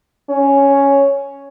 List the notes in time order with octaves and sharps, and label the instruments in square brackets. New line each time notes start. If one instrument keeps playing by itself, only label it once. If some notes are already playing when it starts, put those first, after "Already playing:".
[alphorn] C#4